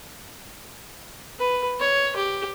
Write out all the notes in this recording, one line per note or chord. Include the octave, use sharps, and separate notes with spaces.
B4
C#5
G4